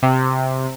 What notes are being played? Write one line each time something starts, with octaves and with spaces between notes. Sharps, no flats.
C3